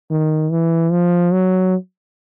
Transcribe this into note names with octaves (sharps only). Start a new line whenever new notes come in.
D#3
E3
F3
F#3